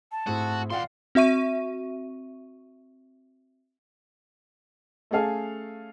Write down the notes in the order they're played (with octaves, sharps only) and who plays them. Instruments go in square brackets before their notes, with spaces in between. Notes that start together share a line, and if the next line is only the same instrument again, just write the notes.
[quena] A5
[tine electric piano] G#2 A3 [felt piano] C4 E4 G#4 [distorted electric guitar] F#4
[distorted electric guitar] D#2 C6 [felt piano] A#2 D5 F#5 [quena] F5
[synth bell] C4 F#4 E5 C#6 D#7
[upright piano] A3 C#4 G#4 A4 F5 G#5